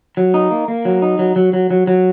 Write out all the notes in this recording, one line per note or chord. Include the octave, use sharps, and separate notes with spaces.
F#3
D#4
A#3
A#3
F#3
D#4
F#3
F#3
F#3
F#3
F#3